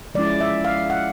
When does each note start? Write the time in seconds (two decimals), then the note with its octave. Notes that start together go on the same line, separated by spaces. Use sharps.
0.15 F3 G#3 C#4 E4 D5
0.40 E5
0.65 F5
0.90 F#5